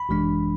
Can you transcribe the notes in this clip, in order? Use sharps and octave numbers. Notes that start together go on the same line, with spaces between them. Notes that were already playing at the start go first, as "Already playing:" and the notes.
Already playing: B5
G#1 F#2 E3 G#3 D4